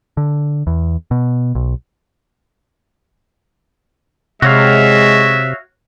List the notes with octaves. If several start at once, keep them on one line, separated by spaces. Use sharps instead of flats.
D3
E2
B2
B1
C3 G#3 F#4 C#5 E5 F5